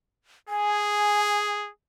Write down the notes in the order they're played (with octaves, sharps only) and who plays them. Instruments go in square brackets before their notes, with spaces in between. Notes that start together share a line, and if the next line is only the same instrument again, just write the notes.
[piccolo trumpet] G#4 [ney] G#5